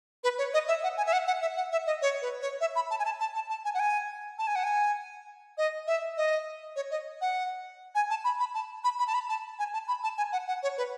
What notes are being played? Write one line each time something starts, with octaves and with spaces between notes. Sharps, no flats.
B4
C#5
D#5
E5
F#5
G#5
E5
F#5
F#5
E5
F#5
E5
D#5
C#5
B4
C#5
E5
B5
A5
G#5
A5
A5
A5
A5
G#5
F#5
G#5
A5
G#5
F#5
G#5
D#5
E5
D#5
C#5
D#5
F#5
G#5
A5
B5
B5
A5
B5
B5
A5
B5
A5
G#5
A5
B5
A5
G#5
F#5
F#5
C#5
B4